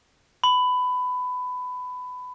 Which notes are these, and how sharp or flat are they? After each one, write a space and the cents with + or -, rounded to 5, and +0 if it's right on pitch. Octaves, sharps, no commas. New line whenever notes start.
B5 +20